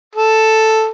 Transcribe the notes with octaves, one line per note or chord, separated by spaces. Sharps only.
A4